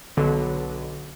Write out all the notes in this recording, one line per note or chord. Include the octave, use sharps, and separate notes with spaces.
B1 D3 F#3